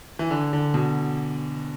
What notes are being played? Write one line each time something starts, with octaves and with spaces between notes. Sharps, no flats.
E3
D3
D3
B2